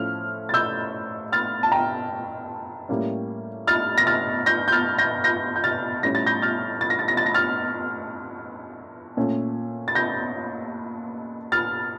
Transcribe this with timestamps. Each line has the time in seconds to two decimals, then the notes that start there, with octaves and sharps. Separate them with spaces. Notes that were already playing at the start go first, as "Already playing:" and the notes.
Already playing: A2 F3 A3 C#4 F6
0.49 A6
0.54 E6 G6
1.32 F6 A6
1.63 A5
1.72 G5 A#5
2.89 A2 G3 A#3 C#4
3.67 F6 A6
3.98 A#6
4.07 F6 A6
4.46 G6 A#6
4.68 G6
4.72 F6 A6
4.98 G6 A#6
5.24 G6 A#6
5.56 G6
5.64 F6 A6
6.03 A2 G3 C#4 A#6
6.15 A6
6.26 G6 A#6
6.42 F6 A6
6.81 A6
6.90 A#6
6.99 A6
7.08 A#6
7.17 A6
7.26 A#6
7.34 F6 A6
9.17 A#2 A3 C#4
9.88 A6
9.95 G6 A#6
11.52 F6 A6